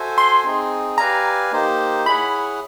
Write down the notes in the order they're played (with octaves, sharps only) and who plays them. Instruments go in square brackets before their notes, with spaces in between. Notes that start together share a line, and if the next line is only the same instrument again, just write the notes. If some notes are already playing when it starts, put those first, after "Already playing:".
Already playing: [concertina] F#4 A4 C5 E5 G#5
[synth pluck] C6
[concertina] C4 D#4 G#4
[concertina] G4 B4 D5 F5 G#5 [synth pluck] A#5
[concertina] A#3 D#4 G4 C5
[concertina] E4 G#4 C#5 F#5 [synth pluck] B5